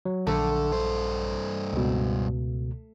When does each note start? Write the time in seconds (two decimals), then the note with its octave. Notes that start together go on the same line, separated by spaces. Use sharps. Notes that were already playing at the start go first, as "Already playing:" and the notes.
0.05 F#3
0.27 A#1 D3 A3
0.72 G2 C5
1.73 C#2 B2